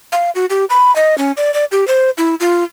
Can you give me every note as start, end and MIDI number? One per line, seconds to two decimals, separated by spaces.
0.12 0.30 77
0.35 0.46 66
0.50 0.65 67
0.70 0.94 83
0.96 1.17 75
1.18 1.32 61
1.37 1.53 74
1.54 1.65 74
1.71 1.87 67
1.87 2.10 72
2.18 2.35 64
2.40 2.63 65